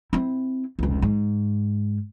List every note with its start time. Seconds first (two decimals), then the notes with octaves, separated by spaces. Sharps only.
0.13 C4 E4
0.79 F1 C#2
1.02 G#2